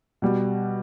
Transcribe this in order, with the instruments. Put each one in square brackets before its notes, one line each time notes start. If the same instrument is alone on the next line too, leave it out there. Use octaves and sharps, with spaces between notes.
[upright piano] B2 G3